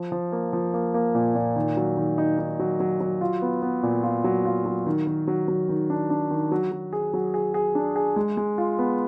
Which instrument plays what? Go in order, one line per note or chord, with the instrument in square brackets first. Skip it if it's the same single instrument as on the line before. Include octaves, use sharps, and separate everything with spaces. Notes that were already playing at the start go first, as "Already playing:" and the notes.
Already playing: [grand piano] F3
F3
A#3
F3
A#3
A#3
A#2
A#2
D#3
F#3
D#3
D#4
D#4
F#3
F#3
F#3
F4
B3
B3
A#2
F4
F#3
F4
F#3
D#3
D#3
F#3
F#3
D#3
D4
D4
D#3
F#3
F#3
G#4
F#3
G#4
G#4
D4
G#4
G#3
G#3
F4
B3